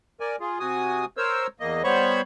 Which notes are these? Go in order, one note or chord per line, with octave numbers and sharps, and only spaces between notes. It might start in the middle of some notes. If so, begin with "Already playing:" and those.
A#4 D5 G#5
F4 G#4
C3 F#4 G#5 D#6
A#4 C5 C#5 E6
E2 A#3 D#5
G3 B3 C5 C#5 B5 C#6